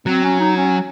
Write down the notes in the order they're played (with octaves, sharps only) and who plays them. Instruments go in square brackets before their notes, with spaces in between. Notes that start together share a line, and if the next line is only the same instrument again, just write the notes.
[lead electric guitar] F#3 [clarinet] C4
[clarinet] C#4
D#4
C#4